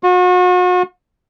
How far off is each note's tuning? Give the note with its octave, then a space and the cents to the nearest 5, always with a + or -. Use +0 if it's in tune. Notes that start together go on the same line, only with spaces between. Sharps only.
F#4 -40